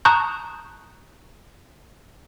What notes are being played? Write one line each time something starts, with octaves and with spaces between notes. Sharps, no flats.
A5 A#5 C#6 D#6 F#6 G6